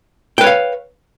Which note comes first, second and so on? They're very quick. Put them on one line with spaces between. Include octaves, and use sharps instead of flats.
G5 B4 C#5 F5